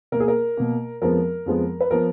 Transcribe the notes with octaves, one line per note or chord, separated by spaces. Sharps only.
B2 A#3 A#4
G#4
A#4
B2 A#3
F2 F3 G#3 B3 A#4
F2 F3 G#3 B3
B4
F3 B3 A#4